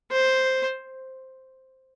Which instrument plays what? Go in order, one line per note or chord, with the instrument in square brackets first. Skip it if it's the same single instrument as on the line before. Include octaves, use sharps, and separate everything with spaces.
[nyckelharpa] C5